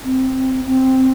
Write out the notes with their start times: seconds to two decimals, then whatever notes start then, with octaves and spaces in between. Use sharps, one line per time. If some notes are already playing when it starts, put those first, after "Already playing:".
0.04 C4
0.66 C4